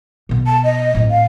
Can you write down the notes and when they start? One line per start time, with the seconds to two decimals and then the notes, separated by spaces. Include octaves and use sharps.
0.29 B2 B3
0.47 A5
0.64 D#5
0.95 A2 C4
1.11 F5